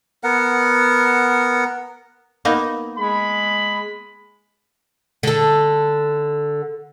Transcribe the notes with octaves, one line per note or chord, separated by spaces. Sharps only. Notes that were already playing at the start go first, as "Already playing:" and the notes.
B3 A#4 F#5
A#3 B3 D#4
G#3 B5
D3 A4